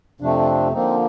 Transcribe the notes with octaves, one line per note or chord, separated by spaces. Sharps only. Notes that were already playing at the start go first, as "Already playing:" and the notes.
F2 C3 F3 A3 C4 D4
D3 F3 A#3 C4 D#4